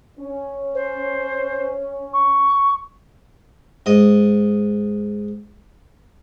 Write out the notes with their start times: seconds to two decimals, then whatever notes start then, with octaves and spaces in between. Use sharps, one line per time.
0.19 C#4
0.74 C5
2.13 C#6
3.86 G#2 D#5